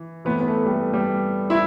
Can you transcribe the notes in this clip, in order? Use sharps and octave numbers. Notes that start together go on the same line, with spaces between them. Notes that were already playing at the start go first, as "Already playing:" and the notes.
Already playing: E3
A2 E3 B3
B3
A3
G3
A3
G3
E4